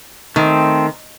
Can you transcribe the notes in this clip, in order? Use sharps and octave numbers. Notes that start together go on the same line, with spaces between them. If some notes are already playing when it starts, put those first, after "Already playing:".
D#3 A3 C4